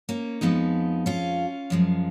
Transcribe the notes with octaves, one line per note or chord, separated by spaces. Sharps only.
A#3 C#4
F2 F3 G#3 B3 D#4
C#4 F4
F#2 F3 G#3